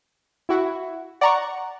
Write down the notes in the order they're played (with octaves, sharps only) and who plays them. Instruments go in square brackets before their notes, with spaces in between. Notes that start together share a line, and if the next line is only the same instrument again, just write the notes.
[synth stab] E4 F#4
[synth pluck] D5 A#5 C#6 [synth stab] F#5